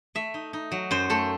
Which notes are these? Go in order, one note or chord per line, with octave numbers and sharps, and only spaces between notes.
A3 E5
D#4
D#4
F#3
F#2 C5
A3 A4